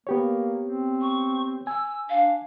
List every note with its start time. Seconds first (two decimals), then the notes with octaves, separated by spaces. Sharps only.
0.07 A#3 B3 G4 C#5
0.62 C4
1.01 C#6
1.67 G#5 E6
2.09 D4 F5